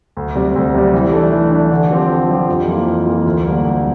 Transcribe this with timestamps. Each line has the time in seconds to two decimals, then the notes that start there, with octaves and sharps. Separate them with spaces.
0.17 D2
0.35 C3 G3
0.56 D2
0.74 C3 G3
0.94 E3
1.13 A3 D4
1.32 E3
1.52 A3 D4
1.71 D3
1.90 F3 C4 G4
2.10 D3
2.29 F3 C4 G4
2.48 F2
2.67 E3 A#3 F4
2.87 F2
3.06 E3 A#3 F4
3.26 D2
3.45 D3 G3 A#3
3.64 D2